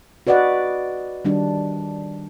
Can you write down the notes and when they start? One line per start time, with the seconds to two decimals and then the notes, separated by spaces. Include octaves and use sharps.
0.27 F#4 B4 D5 D#5 F#5
1.25 D#3 G3 D4